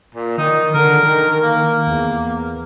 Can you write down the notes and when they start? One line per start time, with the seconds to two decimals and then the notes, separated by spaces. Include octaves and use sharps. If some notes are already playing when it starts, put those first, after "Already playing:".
0.14 A#2
0.38 D#3 D#4
0.74 D3 A#4
1.03 D#3
1.43 A#3
1.87 E2